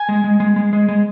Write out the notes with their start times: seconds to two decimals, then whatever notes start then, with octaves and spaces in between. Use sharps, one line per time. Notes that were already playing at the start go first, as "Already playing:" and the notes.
Already playing: G#5
0.09 G#3
0.24 G#3
0.40 G#3
0.56 G#3
0.73 G#3
0.89 G#3